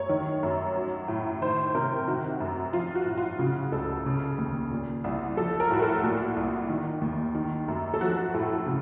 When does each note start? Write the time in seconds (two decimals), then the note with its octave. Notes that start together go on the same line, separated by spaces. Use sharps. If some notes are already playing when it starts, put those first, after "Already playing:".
Already playing: F#2 C#5
0.09 D#3
0.43 F#2
0.76 F#3
1.08 A2
1.41 D#3 C5
1.75 C3 A#4
2.07 D#3 F#4
2.40 F#2
2.73 F3 F4
2.95 F#4
3.06 A2
3.18 F4
3.39 C#3 F#4
3.72 C#2 A4
4.06 C#3
4.38 D#2
4.71 A#2
5.04 C2
5.37 F3 A4
5.60 A#4
5.71 A2 F#4
5.82 A4
6.04 A#2 F#4
6.36 C2
6.70 D#3
7.02 D#2
7.35 D#3
7.68 F#2
7.94 A4
8.01 F3 F#4
8.17 F#4
8.34 A2 A4
8.66 C#3